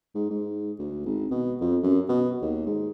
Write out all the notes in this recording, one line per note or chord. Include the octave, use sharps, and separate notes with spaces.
G#2
G#2
D2
G#1
B2
F2
F#2
B2
D#2
G#2